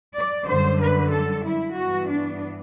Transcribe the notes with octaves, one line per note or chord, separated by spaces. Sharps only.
D5
F#2 D3 G3 C5
B4
A4
E4
G2 E3 B3 F#4
D4